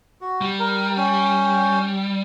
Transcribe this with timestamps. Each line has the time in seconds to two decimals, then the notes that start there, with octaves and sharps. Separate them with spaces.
0.21 F#4
0.41 G3
0.59 A#4
0.97 C#4 G5